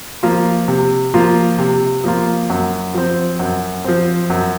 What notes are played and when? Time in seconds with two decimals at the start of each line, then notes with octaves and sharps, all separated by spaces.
0.23 F3 A#3 F4
0.68 C3
1.14 F3 A#3 F4
1.59 C3
2.04 F3 A#3 F4
2.50 F#2
2.94 F3 C4
3.39 F#2
3.85 F3 C4
4.30 F#2